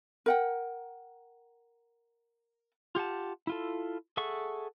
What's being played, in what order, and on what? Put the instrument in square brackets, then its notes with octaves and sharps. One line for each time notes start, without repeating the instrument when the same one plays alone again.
[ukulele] A#4 F#5 G5
[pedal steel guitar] F4 G4 F#5 A5
E4 F4 A4
G#4 A4 E5 F#5 C#6